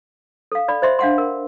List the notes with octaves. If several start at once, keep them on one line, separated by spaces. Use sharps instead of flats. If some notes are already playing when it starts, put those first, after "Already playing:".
A4 F5
D5 B5
C5 D#5 E5 C6
D4 F5 F#5 C6
A#4